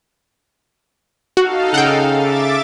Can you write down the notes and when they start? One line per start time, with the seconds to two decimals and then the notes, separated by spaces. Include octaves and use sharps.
1.37 D#4 F#4 A4 F5
1.74 C#3 F#5 G5
2.14 E5 D6 A6